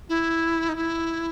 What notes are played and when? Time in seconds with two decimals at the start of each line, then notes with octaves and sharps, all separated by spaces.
0.09 E4
0.69 D#4
0.76 E4